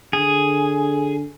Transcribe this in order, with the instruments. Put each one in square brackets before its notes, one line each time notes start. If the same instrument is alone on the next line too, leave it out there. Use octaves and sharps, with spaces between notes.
[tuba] D3 [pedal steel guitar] G#4